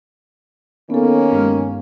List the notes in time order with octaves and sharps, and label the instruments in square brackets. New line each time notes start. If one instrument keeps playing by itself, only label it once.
[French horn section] D#3 A#3 C#4 [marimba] B3 A4
[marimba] G2 G#3 F6